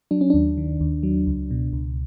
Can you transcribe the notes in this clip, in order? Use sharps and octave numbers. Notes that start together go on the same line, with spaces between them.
F#3 D4
C#4
D#2 D4
D#3
D#2
F#3
C#2
B2
C#2